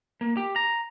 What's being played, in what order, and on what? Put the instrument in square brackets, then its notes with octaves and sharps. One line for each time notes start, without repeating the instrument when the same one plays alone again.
[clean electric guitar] A#3
G4
A#5